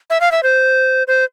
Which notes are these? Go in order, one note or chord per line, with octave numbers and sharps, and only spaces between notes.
E5
F5
E5
C5
C5